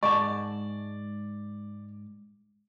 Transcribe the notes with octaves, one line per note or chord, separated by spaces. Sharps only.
G#2 D5 A5 C#6